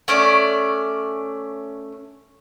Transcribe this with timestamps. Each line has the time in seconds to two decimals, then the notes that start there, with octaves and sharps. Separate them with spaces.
0.08 A3 C#4 D5